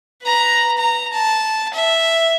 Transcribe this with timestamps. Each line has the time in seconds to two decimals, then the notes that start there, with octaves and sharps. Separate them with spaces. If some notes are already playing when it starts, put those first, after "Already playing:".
0.23 B4 A#5
0.78 A#5
1.13 A5
1.74 E5